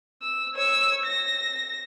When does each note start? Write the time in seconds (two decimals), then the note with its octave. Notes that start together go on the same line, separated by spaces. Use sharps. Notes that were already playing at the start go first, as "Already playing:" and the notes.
0.22 E6
0.55 C#5 E6
1.05 A#6